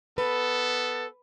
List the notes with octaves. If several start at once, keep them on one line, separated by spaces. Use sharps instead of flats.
B3 A4 B4